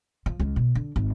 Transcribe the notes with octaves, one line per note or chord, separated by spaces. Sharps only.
F3
C#2
B2
D3
G#1